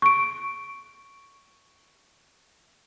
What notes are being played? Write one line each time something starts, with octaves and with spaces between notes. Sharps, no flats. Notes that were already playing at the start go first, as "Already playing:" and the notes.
C#6 D7